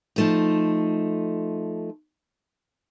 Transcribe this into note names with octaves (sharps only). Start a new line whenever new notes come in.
F3 A3 D#4